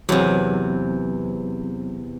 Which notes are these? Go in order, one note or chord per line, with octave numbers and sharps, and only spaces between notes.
E2 C3 F#3 C4